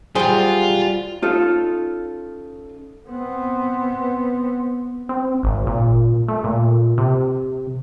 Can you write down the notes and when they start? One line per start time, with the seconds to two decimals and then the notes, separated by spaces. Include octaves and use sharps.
0.15 F#3 G3 F4 G#4 C5 G5
1.22 C#4 D#4 F4 A4
3.08 B3 C4
5.09 C4
5.43 G#1
5.67 A#2
6.28 A3
6.44 A#2
6.98 C3